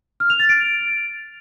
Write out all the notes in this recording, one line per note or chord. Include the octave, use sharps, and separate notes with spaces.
F6
F7
A6
D7